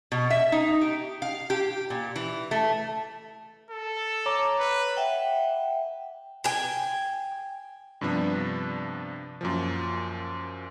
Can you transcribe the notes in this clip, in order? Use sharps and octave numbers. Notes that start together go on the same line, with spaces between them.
B2
E5
D#4
G4
F5
G4
A#2
E3
A3
A4
C#5 A#5 D6
B4
E5 F#5 G5
G5 G#5
G2 C3 F3 B3 D4
F#2 A#2 F3